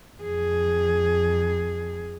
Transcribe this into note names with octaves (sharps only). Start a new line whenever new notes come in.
F2 G#4